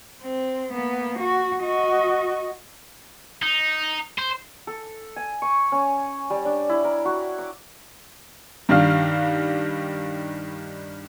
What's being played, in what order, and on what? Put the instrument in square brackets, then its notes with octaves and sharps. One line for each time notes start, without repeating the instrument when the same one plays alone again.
[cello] C4
A#3 B3
F#4
F#4 D#5
[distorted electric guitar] D#4
C5
[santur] A4
G#5
C#6
C#4
G3
D4
E4
A#4
F#4
D6
[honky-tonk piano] G2 D#3 G3 D4 F5 F6